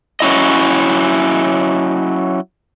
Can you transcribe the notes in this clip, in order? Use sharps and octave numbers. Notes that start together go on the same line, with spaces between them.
F#3 C#4 E4 D#5